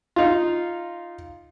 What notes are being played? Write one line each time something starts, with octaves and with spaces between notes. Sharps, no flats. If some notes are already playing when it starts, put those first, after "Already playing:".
D#4 F4